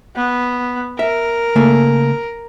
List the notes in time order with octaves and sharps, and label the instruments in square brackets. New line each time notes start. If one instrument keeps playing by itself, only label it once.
[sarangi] B3
[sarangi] A#4 [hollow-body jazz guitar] E5
[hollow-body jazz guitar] C#3 A3 A#3